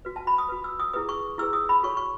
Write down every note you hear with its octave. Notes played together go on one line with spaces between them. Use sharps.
F#4 B4
A5
B5
D#6
F#4 B4
E6
D#6
E4 G#4 B4 D#6
C#6
E4 G#4 B4 E6
D#6
B5
F#4 A4 C#5 C#6
C#6